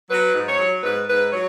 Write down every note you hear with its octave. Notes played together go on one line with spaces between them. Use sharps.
F#3 B4
G#2
C#5
F#3
G#2 B4
G#2 B4
F#3 C#5